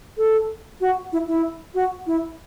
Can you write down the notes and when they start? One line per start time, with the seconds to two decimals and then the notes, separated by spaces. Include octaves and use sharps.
0.18 A4
0.81 F#4
1.13 E4
1.27 E4
1.75 F#4
2.07 E4